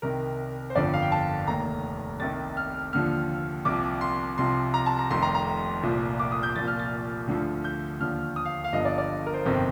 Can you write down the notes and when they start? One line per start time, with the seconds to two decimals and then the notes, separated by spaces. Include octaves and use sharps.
0.02 C2 C3 D#3 A#4
0.70 C5
0.75 G1 F2 D3 F3 D5
0.93 F5
1.02 G5
1.12 A5
1.47 F1 D#2 D#3 A#5
2.20 C2 C3 D#3 A6
2.57 F6
2.93 D#2 D3 F3 F6
3.65 C2 C3 F3 D6
4.01 C6
4.38 C2 C3 F3 C6
4.74 A#5
4.86 A5
4.99 A#5
5.11 F1 F2 C3 D#3 C6
5.22 A#5
5.35 A#5
5.83 C2 A#2 F3
6.19 D6
6.32 D#6
6.43 G6
6.56 C2 A#2 F3 A6
6.68 F6
6.79 A6
7.27 D2 D3 F3
7.64 G6
8.00 D#2 D3 F3 F6
8.36 D#6
8.45 F5
8.64 F5
8.73 G1 G2 F3 D#5
8.85 D5
8.98 D5
9.26 A#4
9.34 C5
9.45 G1 F2 C3 D#3 C5